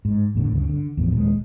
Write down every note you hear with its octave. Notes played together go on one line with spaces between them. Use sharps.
G#2
E2 A2 D3
D2 G2 C#3
D3
E2 A2 F3
D#1 G#3